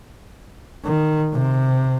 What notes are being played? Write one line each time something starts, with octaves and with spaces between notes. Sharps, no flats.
D#3
C3